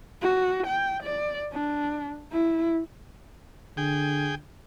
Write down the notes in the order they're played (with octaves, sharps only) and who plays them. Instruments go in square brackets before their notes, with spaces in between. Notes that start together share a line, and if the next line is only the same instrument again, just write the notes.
[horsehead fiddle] F#4
G5
D5
D4
E4
[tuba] D3 [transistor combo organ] G#4 G5